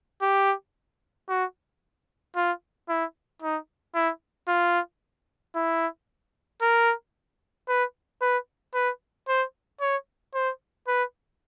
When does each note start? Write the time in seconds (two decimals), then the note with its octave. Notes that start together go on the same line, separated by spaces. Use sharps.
0.22 G4
1.29 F#4
2.36 F4
2.89 E4
3.42 D#4
3.94 E4
4.48 F4
5.55 E4
6.62 A#4
7.68 B4
8.22 B4
8.74 B4
9.28 C5
9.80 C#5
10.34 C5
10.88 B4